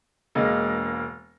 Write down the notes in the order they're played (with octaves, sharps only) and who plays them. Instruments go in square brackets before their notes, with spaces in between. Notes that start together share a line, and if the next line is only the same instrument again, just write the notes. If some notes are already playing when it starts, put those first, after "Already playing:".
[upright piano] E1 G#3 A#3 D#5